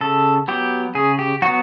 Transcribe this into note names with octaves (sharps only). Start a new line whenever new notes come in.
C#3 A4
F#3 B3 G4
C#3 G#4
G4
F#3 B3 F#4